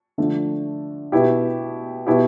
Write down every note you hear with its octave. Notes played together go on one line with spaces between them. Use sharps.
D3 F3 A3 D4
B2 B3 E4 G4
B2 B3 E4 G4